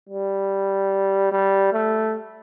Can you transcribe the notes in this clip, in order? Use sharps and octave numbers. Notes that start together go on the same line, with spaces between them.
G3
G3
A3